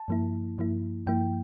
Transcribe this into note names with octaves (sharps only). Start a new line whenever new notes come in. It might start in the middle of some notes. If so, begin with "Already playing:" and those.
Already playing: A5
G2 F3 A#3 E4
G2 F3 A#3 E4
G2 F3 A#3 E4 G5